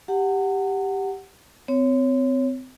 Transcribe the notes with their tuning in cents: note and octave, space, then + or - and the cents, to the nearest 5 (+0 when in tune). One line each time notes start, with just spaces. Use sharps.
G4 +0 F#5 +10 A#5 -40
C4 -30 C#5 +0